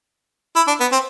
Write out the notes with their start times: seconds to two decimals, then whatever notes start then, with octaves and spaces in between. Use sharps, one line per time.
0.56 E4
0.67 D4
0.80 B3
0.92 C4